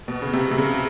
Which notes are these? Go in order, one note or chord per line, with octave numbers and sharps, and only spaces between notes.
B2
C#3
C3
C3
C#3